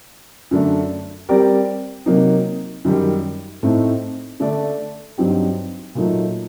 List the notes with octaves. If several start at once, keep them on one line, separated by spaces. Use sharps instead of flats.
F#2 D3 A3 D4
G3 C4 G4 A#4 D5
C3 F#3 A#3 D#4
F#2 D#3 G3
A2 A3 C4 D#4
D3 A3 D4 A4 D5
G2 F#3 C4 D#4 G4
A#2 F#3 A3 D#4